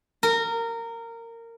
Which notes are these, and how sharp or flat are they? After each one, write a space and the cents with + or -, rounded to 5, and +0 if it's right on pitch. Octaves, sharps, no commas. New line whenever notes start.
A#4 -20